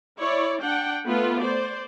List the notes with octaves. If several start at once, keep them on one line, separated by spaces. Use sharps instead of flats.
E4 C#5 D5
D4 F#5 G5
A3 B3 F4 B4
C5 D5